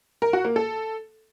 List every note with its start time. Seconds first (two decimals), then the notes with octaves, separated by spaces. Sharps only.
0.22 A#4
0.33 F#4
0.45 A#3
0.56 A4